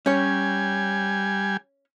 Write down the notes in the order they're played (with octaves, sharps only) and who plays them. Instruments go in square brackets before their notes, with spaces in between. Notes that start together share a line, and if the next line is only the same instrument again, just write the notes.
[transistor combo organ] G3 G#5 [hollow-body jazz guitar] C#4 C#5